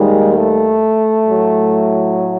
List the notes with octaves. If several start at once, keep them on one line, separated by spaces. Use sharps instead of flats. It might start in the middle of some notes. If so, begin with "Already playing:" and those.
Already playing: D#2 D#3 G3 G#3
A3
A2 F#3